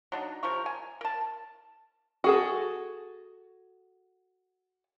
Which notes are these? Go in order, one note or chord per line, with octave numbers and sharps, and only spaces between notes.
F#3 D4 D#4
C3 F3 A#4 C#6
G#5
A#4 A5
F#4 G#4 A4